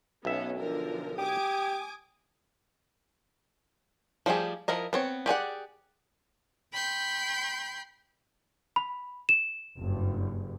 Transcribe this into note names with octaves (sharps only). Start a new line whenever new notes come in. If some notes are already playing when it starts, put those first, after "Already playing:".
B1 B3 C#4 E5
D3 F3 A#4
G4 G#5 D6 D#6
F3 G3 A3 G4 G#4
F3 E4 A#4 D#5
B3 C4 C#5
G4 G#4 D5 F#5
G5 B5 C6 G6
B5
E7
F#1 G2